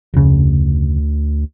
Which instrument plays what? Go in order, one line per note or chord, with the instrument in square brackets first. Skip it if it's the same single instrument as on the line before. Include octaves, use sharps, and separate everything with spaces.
[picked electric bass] F1 C#3 [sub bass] D2